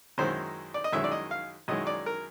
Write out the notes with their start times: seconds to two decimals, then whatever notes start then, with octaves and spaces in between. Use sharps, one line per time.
0.18 F#2 D#3 G#3 C#4 E4 C5
0.74 D5
0.84 D#5
0.93 F#2 D#3 G#3 C#4 E4 E5
1.04 D5
1.12 D#5
1.31 F5
1.68 F#2 D#3 G#3 C#4 E4 D#5
1.87 D5
2.06 A#4